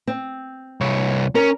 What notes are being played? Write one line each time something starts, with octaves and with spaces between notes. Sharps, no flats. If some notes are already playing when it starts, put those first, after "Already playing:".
C4
C2 C#5
C#4 A#4